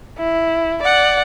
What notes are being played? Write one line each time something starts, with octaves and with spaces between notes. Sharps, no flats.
E4
D5 F#5